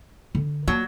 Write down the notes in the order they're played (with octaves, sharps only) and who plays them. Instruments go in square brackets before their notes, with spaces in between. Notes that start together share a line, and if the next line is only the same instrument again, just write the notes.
[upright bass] D3
[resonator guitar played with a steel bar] F#3 [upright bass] A#3 F4